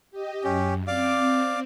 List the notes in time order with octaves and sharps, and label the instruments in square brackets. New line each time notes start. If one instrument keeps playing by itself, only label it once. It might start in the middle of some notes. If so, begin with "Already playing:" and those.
[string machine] G4 D#5
[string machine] F#2 [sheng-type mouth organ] C#4 G4
[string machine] C4 [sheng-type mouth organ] D5 F5 D6